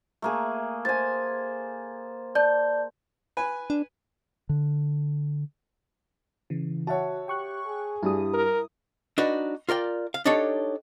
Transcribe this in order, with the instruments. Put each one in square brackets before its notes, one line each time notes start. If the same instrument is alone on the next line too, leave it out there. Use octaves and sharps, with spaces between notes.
[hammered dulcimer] A3 A#3 G#4
[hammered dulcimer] C5 G#5 [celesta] A6
[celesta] D5 A5 G6
[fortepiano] B4 G#5
[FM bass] D4
[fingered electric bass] D3
[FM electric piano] C#3 E3
[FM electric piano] F#4 F#5 [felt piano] C#5 E5 A5
[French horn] G4 [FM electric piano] G5 C#6 F#6
[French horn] G#4
[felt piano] G2 G3 [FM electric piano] E4 D#6
[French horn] A#4
[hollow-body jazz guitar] D4 D#4 F#4 B4
F4 A#4 D5 G5
F5
D4 D#4 G4 A4 C#5